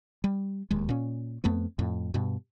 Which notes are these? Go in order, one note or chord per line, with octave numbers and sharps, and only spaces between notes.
G3
D1 D#2 G#3
A#2 C#4
F2 A3 B3 C4
F2 A2
G2 B2